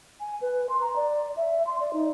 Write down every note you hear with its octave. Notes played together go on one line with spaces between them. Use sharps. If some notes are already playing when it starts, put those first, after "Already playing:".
G#5
B4
C6
A#5
D5
E5
C6
D5
D#4